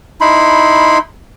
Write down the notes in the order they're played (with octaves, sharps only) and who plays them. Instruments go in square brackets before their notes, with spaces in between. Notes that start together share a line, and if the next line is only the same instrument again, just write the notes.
[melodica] D#4 E4 B5 C6